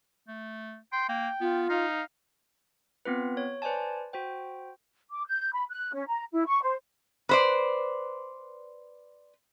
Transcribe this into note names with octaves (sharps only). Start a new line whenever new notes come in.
A3
G5 C6
A#3 G5
B3 F4
D#4 F5
B3 C4 F4 B4
C#5
B4 C5 D5 G#5 A5
F#4 C5 G5
D6
G6
B5
F#6
C#4
A#5
E4
C#6
C5
B4 C5 D5